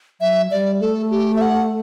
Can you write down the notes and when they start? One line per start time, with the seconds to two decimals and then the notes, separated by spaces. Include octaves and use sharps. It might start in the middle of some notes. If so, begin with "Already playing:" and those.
0.21 F#3 E5
0.51 G3 D5
0.81 A3 A4
1.11 G4
1.36 E5
1.41 F#5